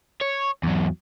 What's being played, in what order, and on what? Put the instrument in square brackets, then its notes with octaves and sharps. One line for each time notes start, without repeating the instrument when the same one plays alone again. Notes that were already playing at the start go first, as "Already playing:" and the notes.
[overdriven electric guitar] C#5
E2 F#3